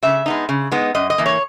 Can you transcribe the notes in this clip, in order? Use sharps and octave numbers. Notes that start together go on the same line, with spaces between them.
C#3 E5
G#3 B3 D#4
C#3
G#3 B3 D#4
F#2 D#5
D#5
E3 A#3
C#5